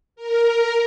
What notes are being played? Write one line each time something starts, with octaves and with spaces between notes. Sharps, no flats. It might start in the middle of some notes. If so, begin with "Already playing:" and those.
A#4